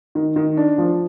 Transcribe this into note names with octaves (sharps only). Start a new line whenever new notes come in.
D#3
D#3
D4
F3